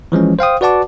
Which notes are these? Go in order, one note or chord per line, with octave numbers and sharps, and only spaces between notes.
E3 F3 G#3 C#4
C5 F5 G5 D#6
F#4 B4 D5 F#5 A5 D6